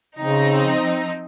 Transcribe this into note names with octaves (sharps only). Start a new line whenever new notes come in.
C#3 F3 C4 D#4